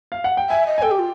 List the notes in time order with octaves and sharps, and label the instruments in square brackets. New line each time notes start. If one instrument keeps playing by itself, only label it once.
[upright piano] F5
F#5
G5
[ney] E5 [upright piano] G#5
[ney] D#5
[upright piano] G#5
[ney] A4 [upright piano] G5
[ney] G4
F4